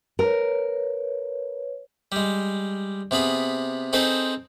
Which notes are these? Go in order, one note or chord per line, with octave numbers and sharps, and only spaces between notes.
A#4 B4 C#5
G3 G#3
C3 B3 G#4 B5
C4 D#4 G#4 A4 B4 C5